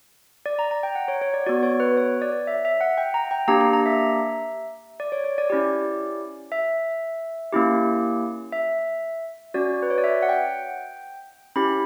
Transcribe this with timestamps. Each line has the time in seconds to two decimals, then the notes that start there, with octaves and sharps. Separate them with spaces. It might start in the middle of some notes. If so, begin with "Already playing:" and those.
0.46 D5
0.59 A#5
0.71 A#5
0.83 G5
0.95 F#5
1.08 C#5
1.22 C#5
1.34 D5
1.46 B3 F#4 D5
1.63 C#5
1.80 B4
1.97 C#5
2.22 D5
2.47 E5
2.65 E5
2.81 F#5
2.98 G5
3.14 A#5
3.31 G5
3.48 A#3 D4 G4 A#5
3.61 A#5
3.73 A#5
3.86 E5
5.00 D5
5.12 C#5
5.24 C#5
5.38 D5
5.50 C#4 E4 G4
6.52 E5
7.53 A#3 C#4 E4 G4
8.53 E5
9.54 C#4 F#4 D5
9.83 B4
9.90 C#5
9.98 D5
10.04 E5
10.22 F#5
10.29 G5
11.55 C#4 E4 G4 B5